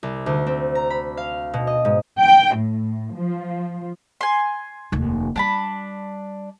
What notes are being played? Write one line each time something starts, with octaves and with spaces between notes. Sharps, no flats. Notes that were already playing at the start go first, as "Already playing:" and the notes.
C2
D2
C4
A#5
B5
F5
B2
D#5
G#2
G5
A2
F3
G#5 C6
F1 D#2
G3 D4 A5 B5